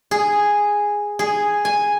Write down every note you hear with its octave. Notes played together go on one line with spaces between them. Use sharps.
G#4
G#4
G#5